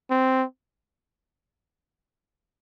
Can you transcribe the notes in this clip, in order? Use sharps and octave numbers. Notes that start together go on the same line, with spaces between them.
C4